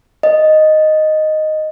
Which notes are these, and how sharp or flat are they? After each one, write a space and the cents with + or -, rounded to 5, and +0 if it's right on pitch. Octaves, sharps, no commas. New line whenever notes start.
D#5 -5